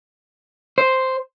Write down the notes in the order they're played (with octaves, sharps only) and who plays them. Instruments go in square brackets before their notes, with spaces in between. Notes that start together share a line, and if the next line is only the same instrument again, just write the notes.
[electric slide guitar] C5